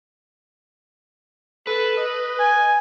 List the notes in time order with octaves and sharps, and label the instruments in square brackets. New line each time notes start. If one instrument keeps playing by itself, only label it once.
[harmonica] A4 [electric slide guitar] B4
[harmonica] D#5
[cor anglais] G#5